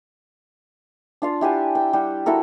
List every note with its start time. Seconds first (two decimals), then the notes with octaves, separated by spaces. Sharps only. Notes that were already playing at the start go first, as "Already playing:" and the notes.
1.22 D4 F4 F5
1.41 E4 G4 F#5 G#5
1.75 G5
1.93 G3 G4 F#5
2.26 E4 F#4 A4 A#4